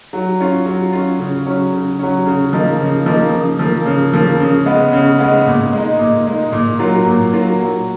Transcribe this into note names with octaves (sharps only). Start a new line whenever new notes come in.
F#3
C#4 F4
F#3
C#4 F4
C#3
F#3 C#4
C#3
F#3 C#4
C#3
F3 A#3 D#4
C#3
F3 A#3 D#4
C#3
F3 A#3
C#3
F3 A#3
C#3
G#3 B3
C#3
G#3 B3
A#2
G#3 D#4
A#2
G#3 D#4
A#2
F#3 A#3 F4
A#2
F#3 A#3 F4
F#3